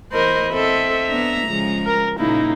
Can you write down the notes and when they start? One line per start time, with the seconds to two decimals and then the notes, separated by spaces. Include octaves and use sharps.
0.12 E2 A#4 C5 D#5 B5
0.54 C4 A4 D#5 E5
1.08 B3 D4 A#5
1.47 C#3 F3 G#3
1.86 A#4
2.18 A#2 C#3 A#3 D#4 E4